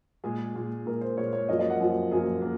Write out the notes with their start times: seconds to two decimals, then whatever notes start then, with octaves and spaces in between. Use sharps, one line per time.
0.24 A#2 G#3 G#4
0.55 A#2 G#3
0.86 A#2 G#3 A#4
1.01 C5
1.17 A#2 G#3 C#5
1.33 C#5
1.49 F#2 F3 A#3 D#5
1.59 D#5
1.70 F#5
1.80 F#2 F3 A#3
2.11 F#2 F3 A#3 G#4
2.42 A#3